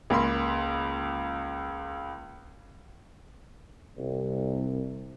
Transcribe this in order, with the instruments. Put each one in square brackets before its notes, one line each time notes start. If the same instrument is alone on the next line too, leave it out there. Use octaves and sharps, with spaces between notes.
[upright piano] C#2 A#3 B5 C6
[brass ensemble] C2